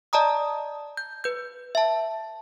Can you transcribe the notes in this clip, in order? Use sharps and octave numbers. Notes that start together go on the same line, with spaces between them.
D5 D#5 A5 A#5 D#6
G6
B4 G6
E5 A5